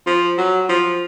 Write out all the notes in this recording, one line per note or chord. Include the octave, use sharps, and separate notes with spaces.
F3
F#3
F3